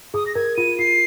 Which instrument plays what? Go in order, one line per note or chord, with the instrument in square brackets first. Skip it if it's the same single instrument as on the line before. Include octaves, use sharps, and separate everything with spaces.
[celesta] G#4 [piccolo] D#6
[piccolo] A#6
[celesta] A#4 [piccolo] G#6
[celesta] F4 [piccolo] D#7
[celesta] F4 [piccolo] C7